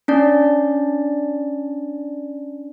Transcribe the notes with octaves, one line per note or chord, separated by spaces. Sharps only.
C#4 D4 D5